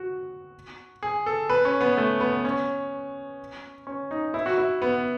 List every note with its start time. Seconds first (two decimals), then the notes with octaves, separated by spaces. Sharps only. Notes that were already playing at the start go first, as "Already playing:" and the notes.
Already playing: F#4
1.03 G#4
1.26 A4
1.50 B4
1.65 C#4
1.81 B3
1.97 A3
2.20 B3
2.45 C#4
3.87 C#4
4.11 D#4
4.34 E4
4.46 F#4
4.58 E4
4.82 B3